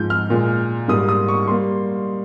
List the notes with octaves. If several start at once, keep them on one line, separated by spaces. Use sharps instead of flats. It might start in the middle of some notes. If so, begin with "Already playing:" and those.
Already playing: G#2 F3 G#3 G6
F6
A#2 G#3
G#2 G3 A#3 D#6
D#6
C#6
G3 A#3 C6